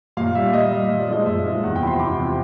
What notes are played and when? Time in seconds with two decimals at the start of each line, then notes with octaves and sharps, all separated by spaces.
0.17 A#2 F5
0.35 G3 E5
0.53 A#2 D#5
0.72 G3
0.90 A#2
0.99 D5
1.08 F3 G#3 D#5
1.26 A#2 E5
1.45 F3 G#3
1.63 E2 F#5
1.76 G5
1.81 C3 F3 B5
1.87 C6
1.99 E2 D6
2.18 C3 F3